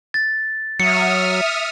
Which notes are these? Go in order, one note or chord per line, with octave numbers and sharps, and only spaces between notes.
A6
F#3 E5 D#6 F6 C#7